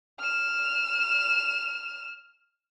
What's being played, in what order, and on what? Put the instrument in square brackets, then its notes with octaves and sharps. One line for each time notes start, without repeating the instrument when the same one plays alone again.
[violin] F6 E7